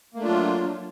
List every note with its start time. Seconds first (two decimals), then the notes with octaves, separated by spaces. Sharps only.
0.14 A#3
0.18 A3
0.21 D4
0.24 F4
0.28 F#3